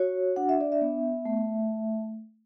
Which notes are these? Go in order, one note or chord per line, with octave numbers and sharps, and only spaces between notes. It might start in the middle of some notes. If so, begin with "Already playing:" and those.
Already playing: F#4 C#5
D4 F#5
E5
D5
E5
B3
A3